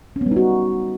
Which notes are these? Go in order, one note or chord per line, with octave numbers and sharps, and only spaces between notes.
C#4
B3
G3
D#4
F#4